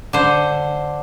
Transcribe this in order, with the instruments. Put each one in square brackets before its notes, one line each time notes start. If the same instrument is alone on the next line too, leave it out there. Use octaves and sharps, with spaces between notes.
[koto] D3 C5